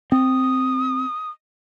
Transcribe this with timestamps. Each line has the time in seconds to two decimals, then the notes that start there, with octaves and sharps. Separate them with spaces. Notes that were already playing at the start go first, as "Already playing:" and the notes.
0.12 C4 D#6